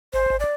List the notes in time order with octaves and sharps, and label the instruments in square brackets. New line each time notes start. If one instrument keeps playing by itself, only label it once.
[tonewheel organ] G#1 [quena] C5
[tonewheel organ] G#1
[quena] D5